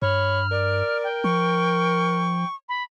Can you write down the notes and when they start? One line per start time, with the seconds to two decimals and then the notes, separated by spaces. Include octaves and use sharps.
0.02 G2 C#5 B5 F6
0.51 A#4 D5
1.04 G5
1.24 F3 C#6
2.69 B5